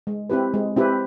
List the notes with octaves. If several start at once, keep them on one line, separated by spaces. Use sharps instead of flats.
G#3
C4 E4 G4 B4
G#3
C4 E4 G4 B4